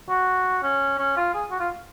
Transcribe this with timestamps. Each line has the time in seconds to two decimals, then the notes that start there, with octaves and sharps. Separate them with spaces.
0.09 F#4
0.63 C#4
0.99 C#4
1.16 F4
1.34 G#4
1.51 F#4
1.60 F4